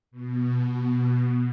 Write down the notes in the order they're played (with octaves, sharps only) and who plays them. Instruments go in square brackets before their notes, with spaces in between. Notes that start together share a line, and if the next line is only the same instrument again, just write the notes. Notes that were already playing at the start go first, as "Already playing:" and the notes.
[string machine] B2